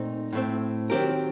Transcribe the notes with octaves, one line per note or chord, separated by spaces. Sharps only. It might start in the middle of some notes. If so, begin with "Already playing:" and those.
Already playing: A#2 A3 C4 D#4
A2 A3 C4
D#3 F#3 C4 G4 A#4